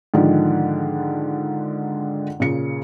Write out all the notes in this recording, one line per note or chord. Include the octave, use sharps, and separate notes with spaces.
G#2 D3 D#3 F3 D4
A#2 C#3 C#7